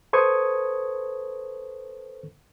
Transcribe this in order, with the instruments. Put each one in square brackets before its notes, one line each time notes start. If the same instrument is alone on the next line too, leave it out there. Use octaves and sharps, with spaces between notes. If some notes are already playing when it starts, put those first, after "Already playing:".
[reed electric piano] A4 B4 C5 C#6 D#6 G#6